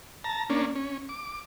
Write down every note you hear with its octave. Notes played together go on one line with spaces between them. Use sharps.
A5 A#5
A#3 C#4 D4
C#4
D6